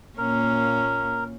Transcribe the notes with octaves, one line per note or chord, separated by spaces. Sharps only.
A#2 A#3 C#4 A#4